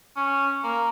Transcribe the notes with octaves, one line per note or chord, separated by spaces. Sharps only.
C#4
A#3